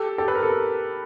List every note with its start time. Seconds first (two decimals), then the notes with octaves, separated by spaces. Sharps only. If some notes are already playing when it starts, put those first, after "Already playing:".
Already playing: G4 A4
0.18 G4 A4
0.28 B4
0.35 A#4
0.42 A4